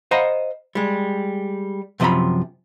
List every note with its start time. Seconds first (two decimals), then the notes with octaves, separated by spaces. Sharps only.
0.11 C5 D#5 F5 F#5 A#5 B5
0.75 G3 G#3
2.00 F#2 C3 F3 D#5 A#5 B5